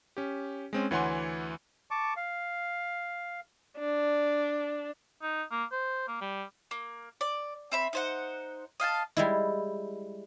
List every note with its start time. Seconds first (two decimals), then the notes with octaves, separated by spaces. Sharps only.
0.17 C#4 G4
0.73 G#3 C4 C#4
0.91 D2 E3 C#5 F#5 G#5 C6
1.91 A5 C#6 D6
2.16 F5
3.79 D4
5.22 D#4
5.51 A#3
5.72 C5
6.08 A#3
6.21 G3
6.71 A#3
7.21 D5
7.72 C4 E5 B5
7.93 D#4 C5 F#5
8.80 D#5 F5 G#5 A5
9.17 G3 G#3 E4